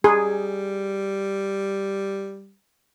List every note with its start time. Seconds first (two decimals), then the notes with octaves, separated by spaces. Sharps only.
0.04 G3 G#4